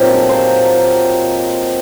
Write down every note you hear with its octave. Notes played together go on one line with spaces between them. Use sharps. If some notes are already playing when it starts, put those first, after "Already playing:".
Already playing: A#2 F#3 C4 D#4 G4
A4
C5